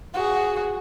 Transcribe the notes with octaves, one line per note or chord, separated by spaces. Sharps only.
F#4 G#4